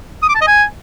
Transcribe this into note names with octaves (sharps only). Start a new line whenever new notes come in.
D#6
D6
A5
D#5
G#5